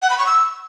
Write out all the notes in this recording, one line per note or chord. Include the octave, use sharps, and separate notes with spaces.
F#5
B5
C#6
E6